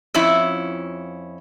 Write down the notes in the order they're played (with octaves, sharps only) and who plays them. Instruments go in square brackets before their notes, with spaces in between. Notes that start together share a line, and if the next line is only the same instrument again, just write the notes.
[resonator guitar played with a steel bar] F2 C#4 E4